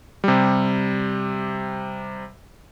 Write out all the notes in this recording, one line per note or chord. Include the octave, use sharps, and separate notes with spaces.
C3 G3